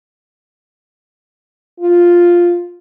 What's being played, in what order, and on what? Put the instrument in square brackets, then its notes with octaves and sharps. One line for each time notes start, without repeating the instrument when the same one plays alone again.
[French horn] F4